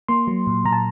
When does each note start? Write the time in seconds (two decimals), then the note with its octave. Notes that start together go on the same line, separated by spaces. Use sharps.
0.08 A#3 C6
0.27 F#3
0.47 A#2
0.65 A#2 A#5
0.73 A5